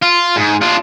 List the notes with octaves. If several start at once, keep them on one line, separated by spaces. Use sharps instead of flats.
F4
G#2
D4 F4